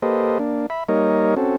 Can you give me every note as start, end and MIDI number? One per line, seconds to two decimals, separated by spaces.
0.02 0.38 58
0.02 0.38 67
0.02 0.38 69
0.02 0.38 71
0.02 0.38 72
0.02 0.38 75
0.39 0.66 58
0.39 0.66 62
0.70 0.84 76
0.70 0.84 83
0.89 1.35 55
0.89 1.35 58
0.89 1.35 63
0.89 1.35 70
0.89 1.35 73
0.89 1.35 75
1.37 1.56 60
1.37 1.56 61
1.37 1.56 66
1.37 1.56 69